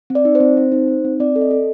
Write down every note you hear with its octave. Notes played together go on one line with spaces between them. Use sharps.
C4
D5
D#4
C5
C4
C4
D#4
D#4
C4
C4 D5
A4
D#5
A4